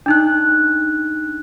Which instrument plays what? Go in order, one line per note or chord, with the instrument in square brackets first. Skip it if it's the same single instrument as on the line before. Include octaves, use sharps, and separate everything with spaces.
[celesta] D4 D#4 F#6